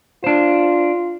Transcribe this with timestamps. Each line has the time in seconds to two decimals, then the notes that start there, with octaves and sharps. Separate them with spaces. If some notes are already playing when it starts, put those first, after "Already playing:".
0.24 D4 F4 C5